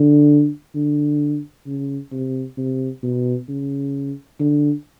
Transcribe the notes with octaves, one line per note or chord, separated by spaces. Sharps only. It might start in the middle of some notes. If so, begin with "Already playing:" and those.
Already playing: D3
D3
C#3
C3
C3
B2
C#3
D3